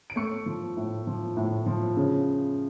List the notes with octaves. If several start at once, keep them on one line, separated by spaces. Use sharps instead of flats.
D7
A3 C#6 C#7
F3
A2
F3
A2
F3
C#3